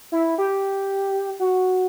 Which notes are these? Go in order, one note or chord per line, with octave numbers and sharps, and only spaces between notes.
E4
G4
F#4